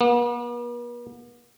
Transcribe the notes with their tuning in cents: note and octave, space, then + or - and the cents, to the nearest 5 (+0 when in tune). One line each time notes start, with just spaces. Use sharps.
B3 -45